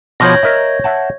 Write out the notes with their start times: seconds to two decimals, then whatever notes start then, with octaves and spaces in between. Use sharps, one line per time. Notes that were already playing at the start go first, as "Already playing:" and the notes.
0.20 B2 F3 C#5 G6 A#6
0.43 A#4 D#5 E5
0.84 E5 F#5 A5